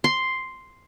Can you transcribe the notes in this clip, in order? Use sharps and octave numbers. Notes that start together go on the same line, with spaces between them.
C6